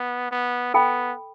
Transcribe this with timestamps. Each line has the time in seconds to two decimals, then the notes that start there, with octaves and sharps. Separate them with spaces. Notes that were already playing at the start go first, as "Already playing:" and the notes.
Already playing: B3
0.31 B3
0.74 B3 A4 G5 B5